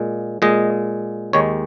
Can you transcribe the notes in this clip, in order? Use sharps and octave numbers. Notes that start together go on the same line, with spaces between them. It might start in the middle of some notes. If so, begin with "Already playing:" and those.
Already playing: A#2 G#3
A#2 G#3 D#5
D#2 D#3 G#3 C#5